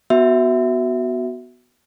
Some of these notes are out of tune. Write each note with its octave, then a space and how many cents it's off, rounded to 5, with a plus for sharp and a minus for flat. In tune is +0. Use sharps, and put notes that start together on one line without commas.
B3 +0 F#4 +0 E5 +0